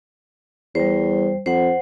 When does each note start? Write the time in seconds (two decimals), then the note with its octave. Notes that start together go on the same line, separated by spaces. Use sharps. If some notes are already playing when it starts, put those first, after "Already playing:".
0.75 E2 G3 C5
1.46 F2 C5 F#5